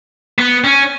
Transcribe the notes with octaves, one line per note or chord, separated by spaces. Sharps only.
B3
C#4